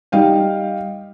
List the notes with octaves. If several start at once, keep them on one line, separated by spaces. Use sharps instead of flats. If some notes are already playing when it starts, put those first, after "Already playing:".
G3 D#4 F5 G5